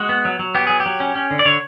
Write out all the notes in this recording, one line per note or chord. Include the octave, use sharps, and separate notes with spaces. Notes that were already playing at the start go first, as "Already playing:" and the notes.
Already playing: G#3 F#4
B3
F#3
F#3
B3 G4
F#3 G#4
G4
F#3
C#4
C#4
D3
D5
D3 C#5